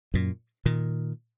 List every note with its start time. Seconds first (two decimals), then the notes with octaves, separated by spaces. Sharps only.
0.14 F#2 A#2
0.66 A#2 D#3